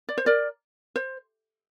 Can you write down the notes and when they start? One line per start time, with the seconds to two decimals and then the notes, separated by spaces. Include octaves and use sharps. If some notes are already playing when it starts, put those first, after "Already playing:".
0.09 D5
0.18 C5
0.26 A#4 D5
0.96 C5